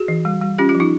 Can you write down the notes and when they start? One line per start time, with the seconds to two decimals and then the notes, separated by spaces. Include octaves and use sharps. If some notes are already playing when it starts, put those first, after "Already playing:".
Already playing: F#4 G#4
0.08 E3
0.25 G3
0.42 G3
0.58 C#4 F4 G4
0.69 F4 G4
0.75 F3
0.80 D#4 F4